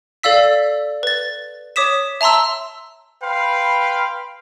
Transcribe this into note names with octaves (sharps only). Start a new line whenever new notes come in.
A4 D5 F5 E6 B6
B4 A6
C#5 D6 D#6 B6 E7
E5 A5 A#5 C6 E6
B4 F5 G5 B5 C6